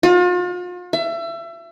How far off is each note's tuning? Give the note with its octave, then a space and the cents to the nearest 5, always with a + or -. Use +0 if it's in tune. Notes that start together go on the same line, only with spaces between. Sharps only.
F4 +40
E5 +30